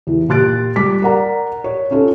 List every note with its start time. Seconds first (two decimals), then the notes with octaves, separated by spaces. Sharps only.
0.07 E2 E3
0.29 A#2 G4 C6 F#6 A6 D7
0.76 G3 D6 B6
1.02 A#4 D5 F#5 A#5
1.64 C#5
1.91 C#4 D#4 F4 A4